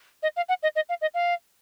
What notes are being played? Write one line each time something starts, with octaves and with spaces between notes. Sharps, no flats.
D#5
F5
F#5
D#5
D#5
F5
D#5
F5